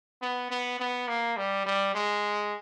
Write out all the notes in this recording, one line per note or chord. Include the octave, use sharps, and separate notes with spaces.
B3
B3
B3
A#3
G3
G3
G#3